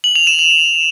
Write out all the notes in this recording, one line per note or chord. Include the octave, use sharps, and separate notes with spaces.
F#7
F7
E7
F7